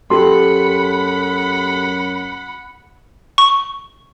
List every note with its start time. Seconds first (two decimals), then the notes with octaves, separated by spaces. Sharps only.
0.10 F#2 G4 A4 F#5 B5 C6
3.38 C#6